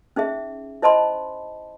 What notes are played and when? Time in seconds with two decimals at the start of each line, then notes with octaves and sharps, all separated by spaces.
0.16 C#4 D#4 G#4 E5
0.82 E4 C5 D#5 A5 B5 C6